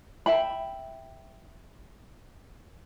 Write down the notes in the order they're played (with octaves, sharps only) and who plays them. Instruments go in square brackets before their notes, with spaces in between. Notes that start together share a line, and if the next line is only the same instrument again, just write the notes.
[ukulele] E5 G5 B5